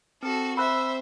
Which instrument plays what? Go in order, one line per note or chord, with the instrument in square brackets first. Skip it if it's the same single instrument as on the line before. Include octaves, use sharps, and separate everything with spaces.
[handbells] C4 [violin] F#4 A4
[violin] C5 E5 [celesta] B5 F#6 [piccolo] E6